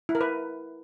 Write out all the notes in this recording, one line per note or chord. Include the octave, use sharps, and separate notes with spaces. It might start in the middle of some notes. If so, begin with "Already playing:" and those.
E4
A#4
B4